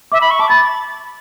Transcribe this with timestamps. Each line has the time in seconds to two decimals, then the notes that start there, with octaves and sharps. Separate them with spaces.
0.12 E5 D6
0.21 B5
0.31 C#6
0.39 A5 D6
0.49 B5 A6